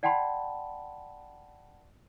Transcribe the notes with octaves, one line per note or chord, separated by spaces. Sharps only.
D5 F#5 G5 A5 B5 C6